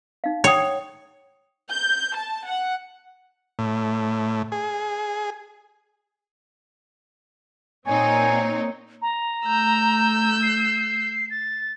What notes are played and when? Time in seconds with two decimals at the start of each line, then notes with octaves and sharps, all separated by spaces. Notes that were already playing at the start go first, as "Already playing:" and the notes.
0.24 D#4 F5
0.44 C#5 F#5 G5 D#6
1.70 G6
2.15 A5
2.47 F#5
3.59 A2
4.52 G#4
7.87 A#2 C4 D#4 C#5 G#5
9.02 A#5
9.46 A3 E6 G6
10.43 C7
11.30 A6